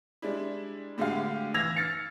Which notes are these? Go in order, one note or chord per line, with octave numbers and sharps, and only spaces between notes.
G3 G#3 D4 E4
A2 D3 G#3 F#4 G4 F5
E3 E6 G#6 A#6 F7
F6 A6 C#7